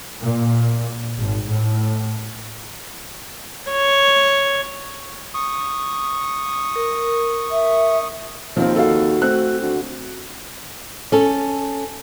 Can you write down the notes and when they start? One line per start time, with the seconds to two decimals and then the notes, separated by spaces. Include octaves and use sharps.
0.21 A#2
1.17 G#1
1.46 A2
3.71 C#5
5.34 C#6 D#6
6.76 A#4
7.51 E5
8.57 D#2 F3 C4 F4
8.76 F#4 A4 F5
9.22 A3 C4 F#6
9.62 D3 F#4
11.12 C#4 A4